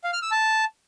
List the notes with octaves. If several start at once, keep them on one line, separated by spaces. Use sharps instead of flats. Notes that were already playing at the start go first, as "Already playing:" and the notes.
F5
F6
E6
A5